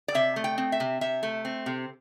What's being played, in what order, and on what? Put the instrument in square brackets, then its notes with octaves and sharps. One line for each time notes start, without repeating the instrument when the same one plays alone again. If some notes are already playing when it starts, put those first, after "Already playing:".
[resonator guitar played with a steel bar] D5
C3 E5
A3
G5
C4
E5
C3
C3 E5
A3
C4
C3